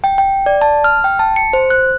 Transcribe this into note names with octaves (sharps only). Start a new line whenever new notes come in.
G5
G5
D5
A5
F6
G5
A5
C#7
C5
F#6